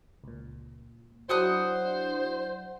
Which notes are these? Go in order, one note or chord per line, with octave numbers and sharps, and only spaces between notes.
C#2 A#2
F#3 D4 E4 C5 F#5 D#6 F#6